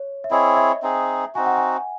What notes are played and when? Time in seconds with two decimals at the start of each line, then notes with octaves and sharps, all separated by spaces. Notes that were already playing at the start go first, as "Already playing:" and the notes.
Already playing: C#5
0.24 E5
0.31 C4 E4 G#4 C#5 D#5
0.57 E5
0.82 C4 D#4 G#4
1.35 C4 D#4 F#4 G#5
1.46 F#5
1.57 G#5